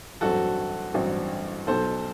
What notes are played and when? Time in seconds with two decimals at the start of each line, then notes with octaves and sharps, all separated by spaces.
0.21 A1 G2 F#3 C4 F#4 A4
0.94 A1 G2 F#3 C4
1.67 B1 B2 F#3 A4 C5